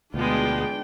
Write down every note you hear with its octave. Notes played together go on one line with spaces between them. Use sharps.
D2 B2 G#3 B3 D4 F4 G5